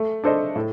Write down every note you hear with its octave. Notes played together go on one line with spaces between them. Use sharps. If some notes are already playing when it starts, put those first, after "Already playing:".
Already playing: A3
D4 A4 C5 D#5
A2